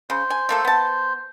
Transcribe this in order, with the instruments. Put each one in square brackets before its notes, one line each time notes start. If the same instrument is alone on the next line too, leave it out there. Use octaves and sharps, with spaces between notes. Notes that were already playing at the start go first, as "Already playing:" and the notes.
[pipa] C#3 [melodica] C5
[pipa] G#5
A3 A#3 A4
B3 A5